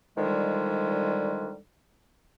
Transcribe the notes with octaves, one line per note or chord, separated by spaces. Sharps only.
D3 D#3 F3 G3 G#3